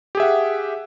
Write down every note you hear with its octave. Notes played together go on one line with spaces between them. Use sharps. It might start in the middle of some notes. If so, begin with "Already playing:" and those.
G4 G#4 E5 F#5